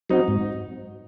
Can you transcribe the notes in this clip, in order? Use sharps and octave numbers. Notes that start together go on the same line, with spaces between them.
F#3 C4 D#4 F#4 D#5
G#2